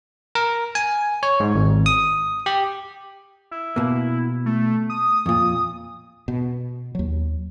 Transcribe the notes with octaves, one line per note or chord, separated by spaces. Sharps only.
A#4
G#5
C#5
G#2
G#1
D#6
G4
E4
B2 A#3
A3
D#6
F2 A#2
B2
D#2 F#3